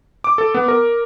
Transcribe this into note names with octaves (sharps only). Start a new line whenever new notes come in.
D6
A4
B3
A#4